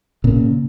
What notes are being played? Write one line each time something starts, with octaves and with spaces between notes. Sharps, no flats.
A#2 C#3